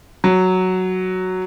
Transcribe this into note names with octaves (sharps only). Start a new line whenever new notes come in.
F#3